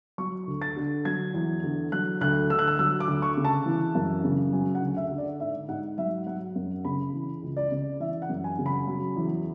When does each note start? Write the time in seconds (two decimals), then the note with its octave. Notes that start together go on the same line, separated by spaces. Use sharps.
0.18 F#3 C#6
0.47 D2
0.62 A6
0.77 D3
1.05 F#3 G#6
1.34 E2
1.64 D3
1.92 F#3 F#6
2.21 D2 F#6
2.50 D3 E6
2.59 F#6
2.68 E6
2.79 F#3 E6
3.00 D6
3.08 D2
3.22 C#6
3.37 C#3
3.44 A5
3.66 E3
3.95 F#2
4.24 C#3
4.53 F#3 G#5
4.75 F#5
4.82 D2
4.96 E5
5.11 D3
5.18 D5
5.40 G#2 E5
5.68 G#2 F#5
5.98 F#3 E5
6.27 F#3 F#5
6.56 F#2
6.85 C#3 B5
7.14 E3
7.43 C#2
7.57 D5
7.71 C#3
8.00 E3 E5
8.22 F#5
8.29 F#2
8.44 G#5
8.58 C#3
8.66 B5
8.87 F#3
9.16 E2